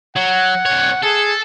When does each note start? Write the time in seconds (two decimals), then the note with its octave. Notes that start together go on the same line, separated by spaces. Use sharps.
0.16 F#3 F#5
0.66 C2 C#5
1.03 G#4 A4